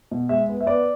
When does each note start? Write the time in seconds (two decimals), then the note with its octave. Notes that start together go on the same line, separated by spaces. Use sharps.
0.11 B2
0.29 G#3 E5
0.49 B3
0.61 E5
0.66 B3 D5